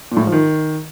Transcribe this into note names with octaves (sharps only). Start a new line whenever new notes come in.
A#2
A2
G#2
F3
D#3